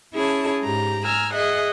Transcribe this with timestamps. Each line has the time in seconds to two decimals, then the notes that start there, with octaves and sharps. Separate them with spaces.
0.13 C#4 E4 G#4 C#5 A5
0.63 G#2 G4 A#5
1.04 G#5 A#5 E6 F6
1.33 G#4 D#5 E5 F#5